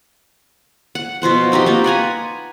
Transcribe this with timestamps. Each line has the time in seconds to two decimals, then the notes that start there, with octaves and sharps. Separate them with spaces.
0.95 F#5
1.22 B2 F3 C5 F#5
1.52 C4 D#4 F#4 G4
1.66 A#3 D#4 F4
1.84 B4 F#5 G#5 A#5